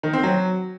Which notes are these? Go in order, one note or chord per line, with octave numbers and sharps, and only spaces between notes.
D#3
C4
F#3